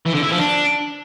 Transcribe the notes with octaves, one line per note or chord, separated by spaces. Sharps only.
E3
D3
E4
F3
D4